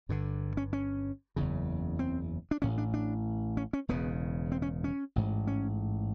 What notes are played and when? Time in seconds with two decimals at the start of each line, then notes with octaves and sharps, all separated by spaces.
0.09 G1 G2 D3
0.57 C#4
0.73 C#4
1.36 F#1 E2 C#3
1.99 C4
2.51 D4
2.62 A1 A2 C#4
2.78 D4
2.94 D4
3.57 C#4
3.73 C#4
3.88 E1 E2 C#3 B3
4.52 C4
4.62 C#4
4.84 C#4
5.16 A1 G#2
5.47 C#4